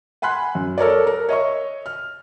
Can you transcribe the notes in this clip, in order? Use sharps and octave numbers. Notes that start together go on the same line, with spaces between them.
F#5 G#5 B5 C6 F#6
F#2
A4 A#4 C#5 D5
A#4
C#5 D#5 E5 C#6
F6